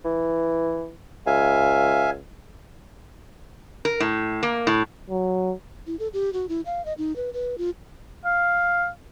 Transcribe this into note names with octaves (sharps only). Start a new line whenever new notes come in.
E3
C#2 E5 F5 G#5
A#4
A2
A#3
A2
F#3
E4
A4
G4
F#4
E4
F5
D#5
D#4
B4
B4
F4
F5